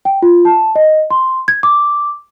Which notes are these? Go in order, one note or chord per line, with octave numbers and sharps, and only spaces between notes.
G5
F4
A5
D#5
C6
G#6
D6